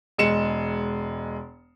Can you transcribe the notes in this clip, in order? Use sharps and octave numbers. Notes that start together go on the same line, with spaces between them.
E1 G#3 C#7 E7